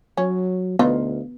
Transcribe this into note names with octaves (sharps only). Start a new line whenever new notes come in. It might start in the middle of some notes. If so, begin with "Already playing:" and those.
F#3 C#4
D2 B3 D#4 F4